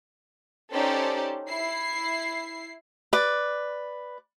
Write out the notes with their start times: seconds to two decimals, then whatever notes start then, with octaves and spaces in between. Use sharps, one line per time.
0.71 C#4 D#4 G4 A4 C5 D5
1.47 E4 C7
3.13 B4 D5 D6